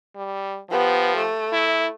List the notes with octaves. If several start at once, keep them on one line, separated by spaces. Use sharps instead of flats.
G3
F3 B3 G4
A3
E4